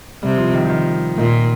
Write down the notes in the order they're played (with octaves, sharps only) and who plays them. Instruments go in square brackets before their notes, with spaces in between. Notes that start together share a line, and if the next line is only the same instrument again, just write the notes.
[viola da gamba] C3 [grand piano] G3
[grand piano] F3
D#3
F3
D#3
[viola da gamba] A#2 [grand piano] D#3